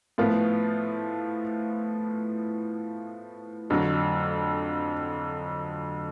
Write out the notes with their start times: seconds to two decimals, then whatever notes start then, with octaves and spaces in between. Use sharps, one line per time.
0.18 A2 F3 B3 F4
3.70 F2 D3 F#3